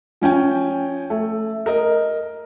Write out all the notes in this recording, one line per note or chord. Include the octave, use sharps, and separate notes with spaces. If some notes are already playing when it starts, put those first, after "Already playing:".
F3 C#4 G5 G#5
A3
A#4 D#5